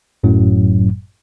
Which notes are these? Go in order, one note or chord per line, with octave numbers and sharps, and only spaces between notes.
G1 F#2 A2 F#3